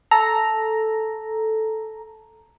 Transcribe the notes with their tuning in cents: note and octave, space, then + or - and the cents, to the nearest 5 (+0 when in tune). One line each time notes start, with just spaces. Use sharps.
A4 -5 A#5 +0